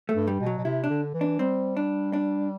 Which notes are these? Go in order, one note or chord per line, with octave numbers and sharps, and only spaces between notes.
A3
G2
G3
B2
F#3
B2
C3 E4
D4
D3
E3
D4
G3 C4
D4
D4